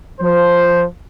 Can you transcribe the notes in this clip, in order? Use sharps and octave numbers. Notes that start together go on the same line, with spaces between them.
F3 C5